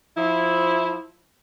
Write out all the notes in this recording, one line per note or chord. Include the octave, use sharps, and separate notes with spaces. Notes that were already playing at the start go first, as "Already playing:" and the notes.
F3 E4